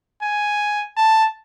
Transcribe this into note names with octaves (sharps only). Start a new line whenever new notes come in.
G#5
A5